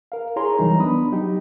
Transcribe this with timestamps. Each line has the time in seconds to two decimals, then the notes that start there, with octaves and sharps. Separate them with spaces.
0.12 A#4 F5
0.36 E4 G#4 A#4 C#5 A#5 C6
0.58 C2 E3 F#3 G3 D#4 A#5
0.78 B3 D4 B5 D#6
1.12 F#3 D#4 G4